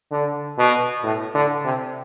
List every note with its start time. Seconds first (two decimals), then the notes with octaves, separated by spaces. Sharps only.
0.11 D3
0.58 B2
1.03 A2
1.34 D3
1.65 C3